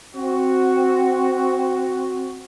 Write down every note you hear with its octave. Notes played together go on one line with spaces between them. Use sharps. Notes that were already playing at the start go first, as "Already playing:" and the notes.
C4 F#4